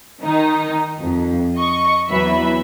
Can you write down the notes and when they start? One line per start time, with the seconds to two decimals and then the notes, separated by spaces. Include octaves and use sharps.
0.22 D#3 D#4
1.01 F2
1.55 D#5 C#6
2.09 E2 E3 F#3 B4 E5 B5